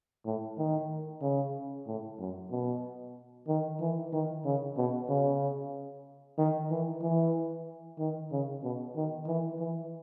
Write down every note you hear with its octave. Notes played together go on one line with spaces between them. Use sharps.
A2
D#3
C#3
A2
F#2
B2
D#3
E3
D#3
C#3
B2
C#3
D#3
E3
E3
D#3
C#3
B2
D#3
E3
E3